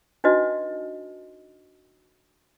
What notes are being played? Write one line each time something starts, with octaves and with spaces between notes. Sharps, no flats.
D4 D#4 F#4 B4 D#5